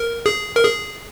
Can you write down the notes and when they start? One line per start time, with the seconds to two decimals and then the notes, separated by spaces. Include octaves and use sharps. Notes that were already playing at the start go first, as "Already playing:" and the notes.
Already playing: A#4
0.26 G#4
0.56 A#4
0.65 G#4